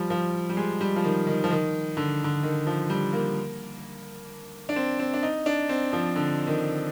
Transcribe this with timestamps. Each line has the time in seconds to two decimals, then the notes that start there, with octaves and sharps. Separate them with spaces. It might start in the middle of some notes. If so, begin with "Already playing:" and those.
Already playing: F3 G3
0.10 F3
0.49 G3
0.57 G#3
0.81 G3
0.96 F3
1.04 D#3
1.27 D#3
1.44 F3
1.50 D#3
1.97 D3
2.24 D3
2.43 D#3
2.67 F3
2.90 G3
3.13 A#3
4.69 D4
4.76 C4
4.99 C4
5.14 D4
5.23 D#4
5.46 D4
5.69 C4
5.93 F3
6.16 D3
6.47 D#3